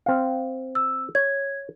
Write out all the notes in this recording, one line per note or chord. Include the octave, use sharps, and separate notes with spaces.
C4 F5
E6
C#5 G#6